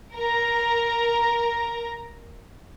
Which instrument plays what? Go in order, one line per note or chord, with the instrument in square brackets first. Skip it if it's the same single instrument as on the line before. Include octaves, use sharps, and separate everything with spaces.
[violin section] A#4 A#5